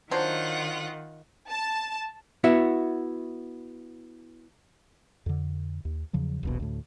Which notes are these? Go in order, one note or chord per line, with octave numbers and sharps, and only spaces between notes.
D#3 F#3 D4 F4 C5 F#5
A5
B3 E4 F#4 E5
F2 D3
D#2
E2 C#3 F3 F#3
D#1 A#1 B2
D2 A2